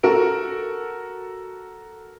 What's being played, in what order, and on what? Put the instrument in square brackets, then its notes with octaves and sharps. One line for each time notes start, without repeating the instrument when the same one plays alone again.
[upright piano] F#4 A4 A#4 D7